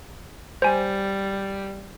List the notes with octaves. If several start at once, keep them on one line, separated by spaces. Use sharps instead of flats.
G3 C5 G#5